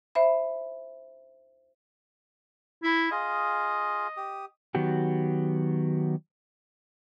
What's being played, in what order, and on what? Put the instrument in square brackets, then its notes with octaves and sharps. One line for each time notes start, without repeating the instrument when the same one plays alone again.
[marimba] C5 E5 B5
[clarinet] E4
[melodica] F4 G#4 F5 [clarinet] D#5
[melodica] G4 D#6
[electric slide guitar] D#3 F#3 B3 F#4 G4